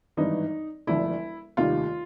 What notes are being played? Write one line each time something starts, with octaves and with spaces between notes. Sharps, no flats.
G#1 G2 E3 D#4
E1 D2 D3 F3 E4
F1 D#2 D#3 G3 F4